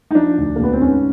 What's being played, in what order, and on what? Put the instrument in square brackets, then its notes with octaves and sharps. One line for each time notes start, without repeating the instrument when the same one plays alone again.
[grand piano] D#4
F3 D4
D2
A#3
D2 B3
C4
G#2 C#4